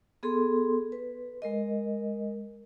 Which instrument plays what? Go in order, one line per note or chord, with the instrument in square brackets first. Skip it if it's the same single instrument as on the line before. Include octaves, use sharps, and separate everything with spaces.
[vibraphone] B3 G#4 A4 C6
B4
G#3 A#4 D#5